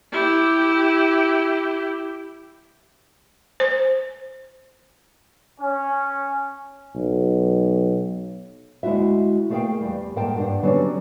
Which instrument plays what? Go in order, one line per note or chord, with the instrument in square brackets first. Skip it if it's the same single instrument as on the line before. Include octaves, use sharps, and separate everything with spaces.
[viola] E4 G4
[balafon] C5
[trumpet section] C#4
[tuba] B1
[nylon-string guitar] D2 G#3 E4 F#4 E5
A3 G#4 A#4 E5 F5 G5
E2 G3
G#2 A#4 F#5 G5 A5
G2 D4 F#5
D3 F#3 G3 B3 C#4 D4